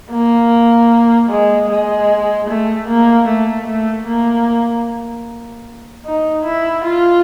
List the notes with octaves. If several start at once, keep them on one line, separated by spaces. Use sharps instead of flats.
A#3
G#3
G#3
A3
A#3
A3
A3
A#3
D#4
E4
F4